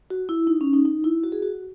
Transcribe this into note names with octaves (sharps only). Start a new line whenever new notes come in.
F#4
E4
D#4
C#4
D#4
D#4
E4
F#4
G#4
F#4